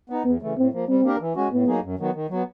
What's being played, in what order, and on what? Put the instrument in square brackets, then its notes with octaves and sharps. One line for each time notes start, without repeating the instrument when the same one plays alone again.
[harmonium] B3 D#4
[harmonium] E2 [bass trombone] B3
[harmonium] C#3 E3 A3
[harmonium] A2 [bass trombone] C4
[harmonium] F3 A#3
[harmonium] G3 [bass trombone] C4
[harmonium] A#3 D4 G4 A#4
E3
G#3 C#4 F#4
[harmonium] A2 [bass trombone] B3
[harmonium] F#3 A#3 D#4 G#4
F#2
D#3 F#3 B3
D#3
F#3 B3